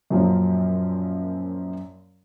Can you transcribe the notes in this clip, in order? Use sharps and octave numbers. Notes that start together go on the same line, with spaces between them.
F#2 A#2 F3 F#3 C#4